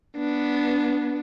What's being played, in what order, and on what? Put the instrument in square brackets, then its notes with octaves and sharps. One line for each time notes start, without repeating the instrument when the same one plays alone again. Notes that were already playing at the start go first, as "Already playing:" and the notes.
[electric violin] B3 D4